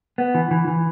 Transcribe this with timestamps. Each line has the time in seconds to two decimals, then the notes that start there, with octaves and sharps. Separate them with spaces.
0.18 B3
0.35 E3
0.51 E3
0.67 E3